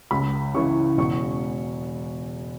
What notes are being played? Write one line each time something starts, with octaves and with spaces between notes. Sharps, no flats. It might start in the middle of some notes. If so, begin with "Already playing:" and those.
C#2 B5
C#3 E3 C#6
E1 C#6